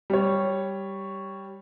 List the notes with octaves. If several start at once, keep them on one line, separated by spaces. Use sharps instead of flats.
G3 C#5